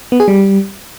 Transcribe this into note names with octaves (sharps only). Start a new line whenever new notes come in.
B3
G#4
G3